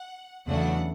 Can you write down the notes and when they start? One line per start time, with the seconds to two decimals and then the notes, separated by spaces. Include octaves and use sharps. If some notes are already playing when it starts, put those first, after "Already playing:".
Already playing: F#5
0.47 E2 C#3 F#3 A3 D4 F#5